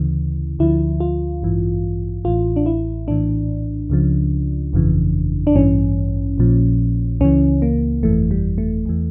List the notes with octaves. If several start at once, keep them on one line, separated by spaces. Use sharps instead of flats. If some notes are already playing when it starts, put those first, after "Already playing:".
Already playing: D2 C#3 E3
D2 D3 F3 E4
F4
A1 G2 E3
A1 A2 E3 F4
D4
E4
A#1 A2 E3 D4
C#2 C#3 F3
G1 F2 C#3 E3
D4
A1 G2 E3 C#4
A#1 A#2 F3
C#2 C#3 E3 C#4
A#3
G1 F2 E3 A3
G3
A3
E2 E3